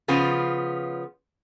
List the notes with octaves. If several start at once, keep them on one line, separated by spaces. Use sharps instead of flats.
C#3 F3 B3 F4